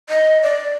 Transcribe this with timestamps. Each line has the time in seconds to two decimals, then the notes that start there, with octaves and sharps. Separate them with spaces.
0.09 D#5
0.43 D5